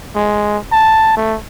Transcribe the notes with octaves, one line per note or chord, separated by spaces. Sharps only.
G#3
A5
A3